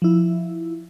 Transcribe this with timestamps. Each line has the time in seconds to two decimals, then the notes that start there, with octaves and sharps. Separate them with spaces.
0.02 F3 E4